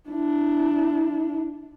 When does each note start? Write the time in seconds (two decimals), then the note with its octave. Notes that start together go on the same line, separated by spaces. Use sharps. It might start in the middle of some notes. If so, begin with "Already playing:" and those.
0.10 D4 E4